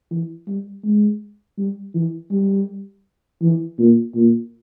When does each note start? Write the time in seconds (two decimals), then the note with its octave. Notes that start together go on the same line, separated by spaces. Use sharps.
0.11 E3
0.48 G3
0.84 G#3
1.58 G3
1.95 E3
2.31 G3
3.42 E3
3.79 A#2
4.16 A#2